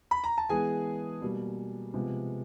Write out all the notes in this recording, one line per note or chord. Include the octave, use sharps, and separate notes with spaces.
B5
A#5
A5
E3 G#3 B3 G#4 G#5
B2 G3 A#3
C3 F3 G#3 B3